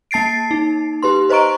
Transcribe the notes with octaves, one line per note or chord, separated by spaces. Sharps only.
A#3 A5 A6 C7 D7
D#4
G4 B4 C6
B4 C5 D#5 A#5 C#6 D7